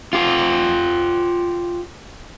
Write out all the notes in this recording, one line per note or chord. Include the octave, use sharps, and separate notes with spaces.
F4 G4